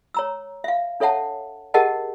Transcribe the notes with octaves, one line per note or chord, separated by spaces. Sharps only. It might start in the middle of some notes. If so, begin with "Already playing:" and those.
C#5 A#5 E6
E5 F5
D4 A4 C#5 E5 F#5 A5
G4 G#4 A#4 D#5 F#5 A5